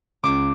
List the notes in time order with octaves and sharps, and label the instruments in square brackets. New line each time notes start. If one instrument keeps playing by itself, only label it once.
[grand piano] C#2 [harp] D6